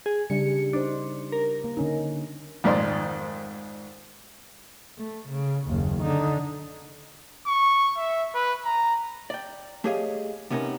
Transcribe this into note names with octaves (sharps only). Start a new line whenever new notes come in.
G#4
C#3 G3 D4 C#7
D4 D#4 C5
A#4
A#3
D3 C#4 D#4
F2 G#2 D#3 D5 C6
A3
C#3
F#1 D#2
D3 D#4
C#6
E5
B4
A#5
D5 G5
A3 G4 G#4 C#5 D#5 F5
C3 B3 C#4 D#4 A#4